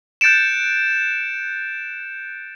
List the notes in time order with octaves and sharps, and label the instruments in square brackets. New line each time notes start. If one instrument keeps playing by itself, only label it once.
[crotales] F#6 G6 A6 C#7 D7 E7